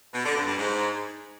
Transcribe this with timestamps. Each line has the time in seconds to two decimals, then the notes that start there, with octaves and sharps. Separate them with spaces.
0.13 B2
0.24 D3
0.36 G2
0.47 G2
0.58 G#2